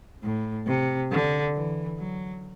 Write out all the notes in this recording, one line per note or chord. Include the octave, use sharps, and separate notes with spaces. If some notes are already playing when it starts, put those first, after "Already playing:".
A2
C3
D3
E3
F#3